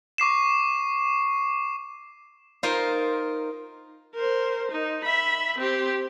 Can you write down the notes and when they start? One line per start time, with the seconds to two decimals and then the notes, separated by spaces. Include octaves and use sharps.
0.18 C#6 D6 C7 E7
2.63 D#4 F4 A#4 C5 D#5
4.15 A#4 C5
4.71 D#4
5.05 E5 B5
5.58 C4 G4